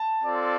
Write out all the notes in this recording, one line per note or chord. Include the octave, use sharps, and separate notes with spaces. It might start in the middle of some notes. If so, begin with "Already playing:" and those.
Already playing: A5
C4 F4 A4 D5